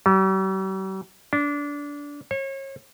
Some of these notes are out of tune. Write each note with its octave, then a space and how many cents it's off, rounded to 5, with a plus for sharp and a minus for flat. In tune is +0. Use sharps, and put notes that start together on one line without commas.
G3 -45
D4 -20
C#5 -35